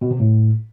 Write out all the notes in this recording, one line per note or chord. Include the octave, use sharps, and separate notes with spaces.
B2
C3
A2